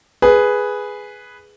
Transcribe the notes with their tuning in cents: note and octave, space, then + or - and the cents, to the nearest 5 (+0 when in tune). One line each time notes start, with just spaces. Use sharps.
G#4 +0 B4 +0